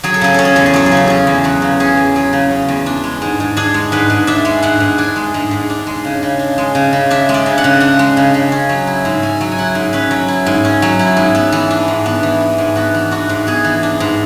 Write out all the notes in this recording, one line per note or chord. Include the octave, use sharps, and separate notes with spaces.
F#3 G#4
A4
C#3 G#4
C#4 A4
G#4
E2 A4
G#4
F#3 A4
G#4
C#3
A4
C#4 G#4
E2
F#3 F#4
C#3
C#4 G#4
E2
F#3 G#4
C#3
C#4
E2
D4
G#3
G#2
G#2
D4 G#4
G#3
G#2 B4
G#2
D4 E5
G#3
G#2 F#5
G#2
D4 G#5
G#3
G#2
G#2
D4
G#3
C#3
C#3
D4
G#3
C#3
C#3
D4 E5
G#3
D5
C#3
F#5
C#3
D4 F#5
G#3
C#3
C#3
C#4
F#3
E4
G#2
C#4 G#5
F#3
G#5
E4 F#5
G#2
C#4 B4
F#3
E4
G#2
C#4
F#3
E4
G#2
B3
E3
D4
G#2
B3
E3
D4
G#2
B3 F#4
E3
D4 F#4
G#2
B3 G#4
E3
D4
G#2